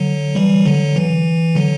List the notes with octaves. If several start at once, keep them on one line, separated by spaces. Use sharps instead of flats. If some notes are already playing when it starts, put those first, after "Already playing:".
Already playing: D3 F#3
E3 G3
D3 F#3
E3
D3 F#3